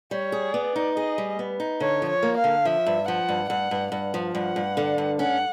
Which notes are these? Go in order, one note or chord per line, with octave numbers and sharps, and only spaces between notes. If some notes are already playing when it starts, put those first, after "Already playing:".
G3 C#5
G#4
B3 D5
D#4
G#4 D#5
G3
B3
D#4
D3 C#5
F3
C#5
A#3
F5
D3
F3 E5
G2
F3 F#5
G2
G2 F#5
G2
G2 F#5
F3
G2 F#5
G2
D3
G2
C#4 F#5